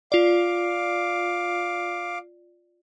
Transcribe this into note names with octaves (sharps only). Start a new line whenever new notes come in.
F4 D5 F5 D6